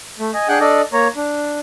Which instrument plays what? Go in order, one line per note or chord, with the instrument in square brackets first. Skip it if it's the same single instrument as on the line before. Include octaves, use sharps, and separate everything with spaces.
[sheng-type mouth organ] A3
D#5 G#5
D4 G#4 F#5 G5 F#6
D4 A4 D5 D#5
A#3 C#5 A#5
D4